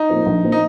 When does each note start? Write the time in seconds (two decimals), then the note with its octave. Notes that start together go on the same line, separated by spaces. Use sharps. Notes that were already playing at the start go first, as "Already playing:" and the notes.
Already playing: D#4
0.09 A#2 F3 C4
0.26 A#1
0.44 A#2 F3 C4
0.52 D#4